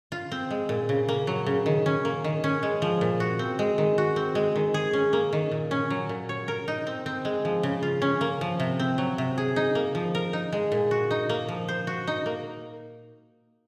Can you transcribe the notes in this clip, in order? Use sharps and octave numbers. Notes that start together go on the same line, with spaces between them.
F4
C4
G#3
A#2
C#3
A#3
F#3
C#3
D#3
C#4
A#3
D#3
C#4
G#3
F3
A#2
F#4
C4
G#3
D#3
F#4
C4
G#3
D#3
G#4
C#4
A#3
D#3
A#2
C#4
F#3
A#2
C#5
A#4
D#4
C4
C4
G#3
F3
C#3
F4
C#4
A#3
F3
C3
C4
F#3
C3
G#4
D#4
A#3
F3
A#4
D#4
G#3
A#2
F#4
D#4
A#3
F3
C5
F#4
D#4
A#3